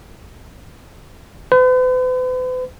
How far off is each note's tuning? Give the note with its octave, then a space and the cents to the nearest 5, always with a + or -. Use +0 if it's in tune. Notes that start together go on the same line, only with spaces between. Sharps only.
B4 +45